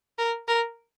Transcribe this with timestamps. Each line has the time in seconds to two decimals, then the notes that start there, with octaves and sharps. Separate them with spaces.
0.18 A#4
0.48 A#4